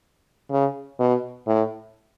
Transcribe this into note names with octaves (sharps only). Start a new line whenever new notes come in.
C#3
B2
A2